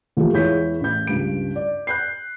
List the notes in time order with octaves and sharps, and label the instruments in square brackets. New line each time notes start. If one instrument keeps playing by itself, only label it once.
[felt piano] A#2 F3 A3 G4
E2 G#3 E4 C#5 G6 B6
A1 G6
C#2 G2 D7
D5
F#6 G6 C7